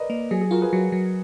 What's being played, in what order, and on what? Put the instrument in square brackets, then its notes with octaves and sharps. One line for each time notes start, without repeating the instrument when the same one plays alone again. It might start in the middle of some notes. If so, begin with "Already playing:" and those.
Already playing: [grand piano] A#4 B4 D5 D#5
[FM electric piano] A#3
[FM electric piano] F#3 [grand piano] G#4
[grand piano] G#4
[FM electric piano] F4 [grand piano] F#4 A#4
[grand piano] G#4 B4
[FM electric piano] F#3 [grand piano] F#4
[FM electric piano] F#3